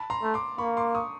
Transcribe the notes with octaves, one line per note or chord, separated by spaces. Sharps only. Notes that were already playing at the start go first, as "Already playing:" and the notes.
Already playing: A5 B5
A#5 C6
A3
C6 D6
A#3 B5 C#6
C6 D6
C#6 D#6